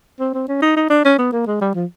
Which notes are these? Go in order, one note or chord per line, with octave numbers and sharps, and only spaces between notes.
C4
C4
C#4
D#4
D#4
D4
C#4
B3
A#3
G#3
G3
F3